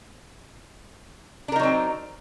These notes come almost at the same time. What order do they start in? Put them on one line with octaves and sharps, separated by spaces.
D4 A#4 D#4 F#3 C4